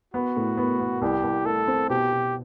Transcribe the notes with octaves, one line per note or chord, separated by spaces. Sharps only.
B3 F#4
A2
B3
B3
C2 G4
C2
A3 A4
C4
B2 G4
B2